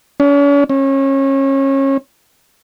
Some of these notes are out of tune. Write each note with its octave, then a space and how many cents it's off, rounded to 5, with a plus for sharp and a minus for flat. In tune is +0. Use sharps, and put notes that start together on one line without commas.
C#4 +40
C#4 -30